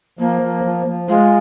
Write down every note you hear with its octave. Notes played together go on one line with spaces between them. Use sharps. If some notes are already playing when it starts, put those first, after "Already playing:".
F3 A#3
F3
F3
F3
G#3 F4